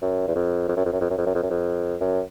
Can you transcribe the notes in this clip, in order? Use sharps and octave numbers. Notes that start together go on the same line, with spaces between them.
F#2
E2
F2
F2
F#2
F2
F#2
F2
F#2
F2
F#2
F2
F#2
F2
F#2